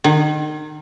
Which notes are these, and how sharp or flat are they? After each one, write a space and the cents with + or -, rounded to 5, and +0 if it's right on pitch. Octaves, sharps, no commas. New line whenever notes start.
D#3 -30